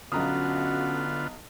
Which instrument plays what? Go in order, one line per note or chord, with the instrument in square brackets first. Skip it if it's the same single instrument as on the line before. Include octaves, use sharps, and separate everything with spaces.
[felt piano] B1 A#5 D#6 [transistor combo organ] D3 B3 F4 [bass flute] C#4 [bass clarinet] F#4